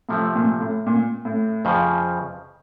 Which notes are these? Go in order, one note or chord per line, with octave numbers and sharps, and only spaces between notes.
A2 C3 F3 A3
A#2
A2
A#2
A2
F2 C#3 F3